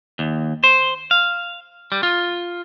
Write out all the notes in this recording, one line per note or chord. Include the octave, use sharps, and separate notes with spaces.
D#2
C5
F5
G3
F4